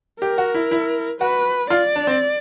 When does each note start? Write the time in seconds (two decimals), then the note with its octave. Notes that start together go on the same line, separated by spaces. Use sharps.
0.21 G4 A#4
0.38 F#4
0.54 E4
0.71 E4
1.21 F#4 B4
1.70 F4 D5
1.96 D4
2.07 C4